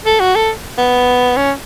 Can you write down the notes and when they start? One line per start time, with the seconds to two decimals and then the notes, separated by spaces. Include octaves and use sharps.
0.06 A4
0.20 F#4
0.35 A4
0.78 B3
1.36 C#4